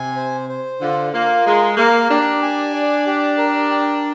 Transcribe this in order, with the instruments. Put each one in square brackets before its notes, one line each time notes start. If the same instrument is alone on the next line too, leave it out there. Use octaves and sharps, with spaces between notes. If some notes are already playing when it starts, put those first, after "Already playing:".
Already playing: [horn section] C3 [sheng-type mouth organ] G#5
[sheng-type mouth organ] C5
C5
[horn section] D3 [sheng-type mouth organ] F4
[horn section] A#3 [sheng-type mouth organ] F4
[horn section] G#3 [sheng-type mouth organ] A#4
[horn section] A#3 [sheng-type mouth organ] A#4
[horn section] D4 [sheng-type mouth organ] G4
[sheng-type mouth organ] G#5
D5
G4
A#4
G5